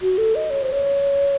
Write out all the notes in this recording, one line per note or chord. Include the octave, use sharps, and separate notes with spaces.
F#4
A4
D#5
C#5
C5
C#5